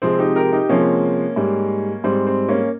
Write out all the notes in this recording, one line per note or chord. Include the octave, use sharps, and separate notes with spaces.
C3 F3 G#3 C4
D#4 G4
G4 A#4
D#4 G4
C3 F3 G#3 A#3 C#4
G#2 G3
G#2 G3 C4
C4
A#3 C#4